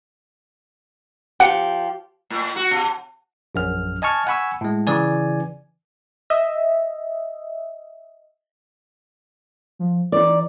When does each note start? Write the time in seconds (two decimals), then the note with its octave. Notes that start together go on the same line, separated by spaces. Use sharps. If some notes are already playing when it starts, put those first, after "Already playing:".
1.40 F3 G4 F#5 C#7
2.30 A2
2.56 F#4
2.71 B2
3.55 A#1 F#2 F6
4.02 D#5 G#5 A5 C#6 F6
4.27 F#5 G#5 B5 C#6 E6
4.61 A2 G#3
4.87 C#3 E3 D5 G#5
6.30 D#5 E5
9.79 F3
10.12 E3 D#4 D5